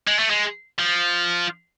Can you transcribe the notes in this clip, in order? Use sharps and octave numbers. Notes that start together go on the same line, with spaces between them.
G#3
A3
G#3
F3